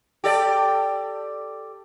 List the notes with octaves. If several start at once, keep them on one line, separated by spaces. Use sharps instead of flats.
G4 A4 D5